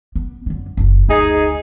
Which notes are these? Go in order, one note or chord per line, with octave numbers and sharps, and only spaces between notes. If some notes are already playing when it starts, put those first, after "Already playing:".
B3
F#2 D3
F#1 F4
D2 D#4 G#4